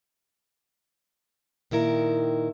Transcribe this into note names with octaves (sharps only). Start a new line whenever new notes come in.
A#2 D#3 E4 A#4